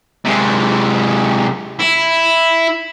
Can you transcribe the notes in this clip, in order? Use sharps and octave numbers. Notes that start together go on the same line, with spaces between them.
C3 G#3
E4